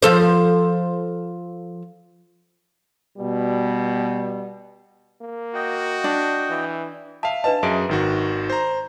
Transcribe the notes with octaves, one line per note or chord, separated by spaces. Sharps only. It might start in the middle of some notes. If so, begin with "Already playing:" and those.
F3 A4 C5
B2 G3
A#3
F#4 D#5 G5
D4
E3
E5 F5 A5
D4 B4 D#5 A5
F#2 G#4 E5 D7
G#1 D#3 F#4
C5 A#5